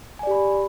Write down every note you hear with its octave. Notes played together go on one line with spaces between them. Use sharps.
G4 D5 G#5 B5